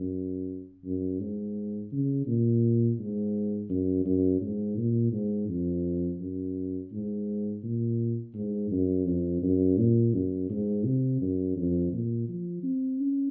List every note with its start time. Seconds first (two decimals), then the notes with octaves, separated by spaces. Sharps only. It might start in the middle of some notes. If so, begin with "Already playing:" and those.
Already playing: F#2
0.84 F#2
1.20 G#2
1.92 C#3
2.27 A#2
2.99 G#2
3.70 F#2
4.05 F#2
4.41 G#2
4.77 A#2
5.13 G#2
5.49 F2
6.20 F#2
6.92 G#2
7.63 A#2
8.34 G#2
8.71 F#2
9.06 F2
9.42 F#2
9.78 A#2
10.14 F#2
10.50 G#2
10.84 C3
11.21 F#2
11.57 F2
11.93 A#2
12.28 F3
12.63 C4
13.00 C#4